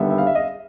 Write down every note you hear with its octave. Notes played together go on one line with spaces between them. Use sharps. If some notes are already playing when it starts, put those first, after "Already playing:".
Already playing: D#2 D3 G3 B3 E5
E5
F5
E5
D#5